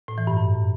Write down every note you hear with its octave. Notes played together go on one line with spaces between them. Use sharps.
A2
E3
G2
F#2